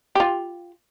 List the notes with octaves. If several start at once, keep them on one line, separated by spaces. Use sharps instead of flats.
F4 G4